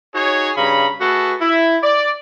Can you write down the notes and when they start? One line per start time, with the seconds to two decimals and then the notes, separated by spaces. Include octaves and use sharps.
0.14 D#4 F#4 G#4 C#5
0.57 G2 C#3 A#5 B5
1.01 A3 F#4 G#4 A4 B4
1.41 E4
1.83 D5